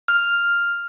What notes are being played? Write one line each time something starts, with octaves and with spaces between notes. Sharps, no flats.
F6